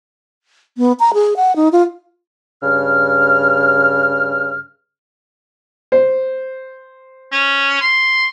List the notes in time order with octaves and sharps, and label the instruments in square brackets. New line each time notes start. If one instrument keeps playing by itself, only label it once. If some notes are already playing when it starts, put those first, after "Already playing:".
[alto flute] B3
A#5
G#4
F#5
D#4
F4
[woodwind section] G2 C#3 F6
[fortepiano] C5
[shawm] C#4
C6